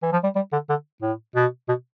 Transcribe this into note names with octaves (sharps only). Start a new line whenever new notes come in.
E3
F3
G3
G3
D3
D3
A2
B2
B2